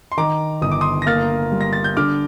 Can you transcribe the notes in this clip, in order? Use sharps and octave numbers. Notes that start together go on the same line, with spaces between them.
C6
D#3 A#5 D6
G1 D#6
D6
C6 D#6
A#6
A#3 F6 A6
G3
A#6
A6
G6
D3 D6 F6